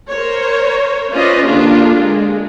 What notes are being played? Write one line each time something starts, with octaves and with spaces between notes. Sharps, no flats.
A#4 C5 C#5
C#4 F4 B4 C5 D5 D#5
D3 A#3 D4 F4 G4 A#4
G#3